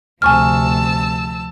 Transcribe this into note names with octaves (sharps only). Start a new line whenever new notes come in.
D2 C3 F3 G#5 A5 C#6 E6 F6